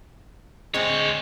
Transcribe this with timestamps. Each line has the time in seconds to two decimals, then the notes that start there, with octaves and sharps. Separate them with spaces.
0.74 D2 G#3 C4 C#5